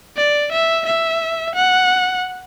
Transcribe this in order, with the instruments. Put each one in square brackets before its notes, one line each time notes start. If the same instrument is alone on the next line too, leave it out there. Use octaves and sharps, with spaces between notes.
[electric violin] D5
E5
E5
F#5